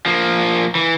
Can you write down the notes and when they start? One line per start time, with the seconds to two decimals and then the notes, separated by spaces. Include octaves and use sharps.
0.06 F3 A#3
0.75 E3